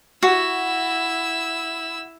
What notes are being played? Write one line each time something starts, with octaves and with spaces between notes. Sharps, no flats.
E4 F#4 E6